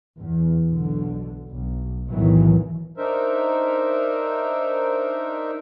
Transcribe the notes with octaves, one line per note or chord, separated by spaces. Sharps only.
E2
B1 D3
B1
B1 E2 A2 D#3 E3 F#3
D4 D#4 A#4 C5 E5